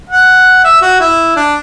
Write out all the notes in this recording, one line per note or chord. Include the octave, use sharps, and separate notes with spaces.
F#5
E5
F#4
E4
D4